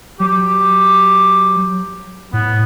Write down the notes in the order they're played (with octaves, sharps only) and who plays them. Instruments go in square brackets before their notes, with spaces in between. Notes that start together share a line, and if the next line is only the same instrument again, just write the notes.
[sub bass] F#3 [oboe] G4
[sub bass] A2 [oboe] B3